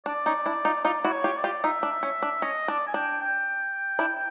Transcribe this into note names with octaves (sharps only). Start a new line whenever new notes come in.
D4 D5
C#4 D#4
D4 E4
D#4 F4
D#4 F4 D5
E4 F#4
C#5
F4 G4
D5
F4 G4
D#4 F4 E5
D4
C#4
D4
C#4 D#5
D4 D5
G#5
D4 G5
G5
D4 E4